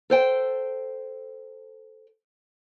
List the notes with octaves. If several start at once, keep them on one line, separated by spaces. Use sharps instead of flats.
A4 C5 G5